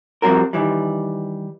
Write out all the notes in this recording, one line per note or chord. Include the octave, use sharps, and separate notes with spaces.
F3 G3 C4 F#4 A#4
D#3 E3 G3